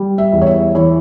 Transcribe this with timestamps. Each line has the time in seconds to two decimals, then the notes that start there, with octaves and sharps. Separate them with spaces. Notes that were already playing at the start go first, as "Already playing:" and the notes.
Already playing: G3
0.18 E5
0.32 E2
0.42 C#5
0.46 E5
0.75 E3 C#5